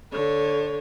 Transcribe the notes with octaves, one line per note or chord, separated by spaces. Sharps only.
D3 C#5